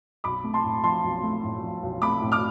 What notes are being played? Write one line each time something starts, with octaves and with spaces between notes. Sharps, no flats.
B1 B5 D6
A3
A5 C6
A2
F3 A5 C6
B1
A3
A2
F3
B1
A3 B5 D6
A2
D6 F6